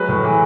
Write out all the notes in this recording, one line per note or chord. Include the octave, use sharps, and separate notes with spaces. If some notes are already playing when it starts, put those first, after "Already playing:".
Already playing: F#3 G#3 B4
A2
E3